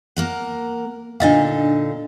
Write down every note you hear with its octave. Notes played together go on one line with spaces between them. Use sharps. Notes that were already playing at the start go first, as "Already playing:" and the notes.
A#3 A#4 F#5
A#2 D3 D4 D#4 D#5 F5